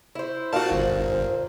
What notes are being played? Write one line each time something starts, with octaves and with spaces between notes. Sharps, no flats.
E4 C5
A#2 D#4 F#4 F5 A5
G1 C5